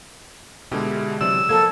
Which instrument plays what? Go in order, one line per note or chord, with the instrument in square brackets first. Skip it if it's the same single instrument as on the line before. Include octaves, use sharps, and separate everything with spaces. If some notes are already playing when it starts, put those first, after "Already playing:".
[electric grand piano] B2 D3 G#3 [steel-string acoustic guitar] E4 G4
[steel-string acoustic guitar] C3 E3 F#3 [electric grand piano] D5 [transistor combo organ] E6
[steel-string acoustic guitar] F3 A#3 [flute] A4 [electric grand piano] G#6